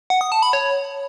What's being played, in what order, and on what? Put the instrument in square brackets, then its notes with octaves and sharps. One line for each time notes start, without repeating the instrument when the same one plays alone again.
[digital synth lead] F#5
D#6
A5
B5
C#5